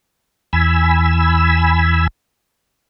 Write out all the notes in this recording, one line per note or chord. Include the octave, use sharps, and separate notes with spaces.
E2 G#5 B5 E6